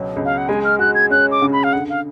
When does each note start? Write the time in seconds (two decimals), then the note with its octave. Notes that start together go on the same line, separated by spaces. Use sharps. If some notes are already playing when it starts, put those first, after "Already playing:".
Already playing: C#2 B2 F#3
0.16 C#2
0.25 F5
0.38 F#5
0.49 G#3 G#5
0.64 F6
0.79 F#4 F#6
0.95 G#6
1.10 C#4 F#6
1.31 D6
1.42 C#3
1.53 B5
1.64 F5
1.73 D3 F#5
1.89 F5